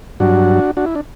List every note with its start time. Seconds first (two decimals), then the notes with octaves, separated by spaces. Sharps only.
0.20 G2 F#3 D4 F#4
0.77 D4 F#4
0.86 E4
0.95 D4